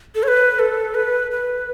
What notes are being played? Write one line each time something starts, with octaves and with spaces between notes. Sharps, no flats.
A4
C#5
B4
A4
B4
B4